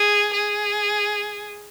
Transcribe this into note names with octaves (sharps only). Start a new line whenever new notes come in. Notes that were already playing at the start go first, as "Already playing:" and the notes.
Already playing: G#4
G#4